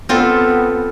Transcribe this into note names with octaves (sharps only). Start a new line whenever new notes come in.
B3 C4 F4 A4